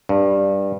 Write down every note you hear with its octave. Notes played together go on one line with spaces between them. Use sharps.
G2